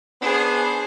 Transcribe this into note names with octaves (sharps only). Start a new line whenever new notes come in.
B3 D4 G#4 C5